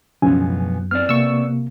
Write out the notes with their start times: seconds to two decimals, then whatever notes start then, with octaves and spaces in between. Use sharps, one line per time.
0.22 C#2 F#2 B2 F3 B3 G#5
0.91 B3 C4 D5 F6
1.09 C3 A#3 C#6 E6